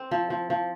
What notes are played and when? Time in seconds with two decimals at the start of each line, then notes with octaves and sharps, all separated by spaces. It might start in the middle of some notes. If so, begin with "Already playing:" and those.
Already playing: C4
0.11 F3
0.30 F3
0.50 F3